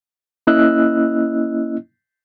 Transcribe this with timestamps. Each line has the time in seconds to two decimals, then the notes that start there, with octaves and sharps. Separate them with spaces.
0.47 A#3 C#4 E4 D#5 E6 F#6